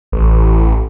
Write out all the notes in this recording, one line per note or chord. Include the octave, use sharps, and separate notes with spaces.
A1